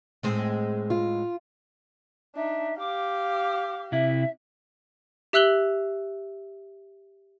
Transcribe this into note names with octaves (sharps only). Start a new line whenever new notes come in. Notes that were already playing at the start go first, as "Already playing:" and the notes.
A2 G#3 C4
F4
D4 D#4 E5
G4 F5 D6
C3 E4 E5
G4 E5 E6 F#6 F#7 G7